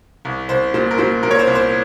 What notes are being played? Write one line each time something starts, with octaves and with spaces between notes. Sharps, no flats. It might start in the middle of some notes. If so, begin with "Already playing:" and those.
C2
C2 C5
A#2 C5
A#4
A#2 C5
A#2 A#4
C#5
C5
C2
C5